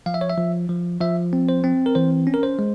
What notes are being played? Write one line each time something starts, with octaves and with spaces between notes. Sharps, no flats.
F3 F5
E5
C#5
E5
F3
F3
F3 E5
C4
C5
C4
A#4
E3 C5
C#4
A#4
C5
G#3